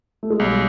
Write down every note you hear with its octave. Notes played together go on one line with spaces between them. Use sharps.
A3
G#3
B1 G3